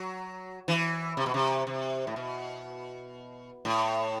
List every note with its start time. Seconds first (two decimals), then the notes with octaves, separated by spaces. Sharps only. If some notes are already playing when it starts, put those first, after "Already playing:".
Already playing: F#3
0.68 E3
1.17 C3
1.26 B2
1.34 C3
1.67 C3
2.07 A2
2.16 B2
3.65 A2